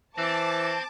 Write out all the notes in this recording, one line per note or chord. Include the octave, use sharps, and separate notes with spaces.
E3 C4 C5 A5 D6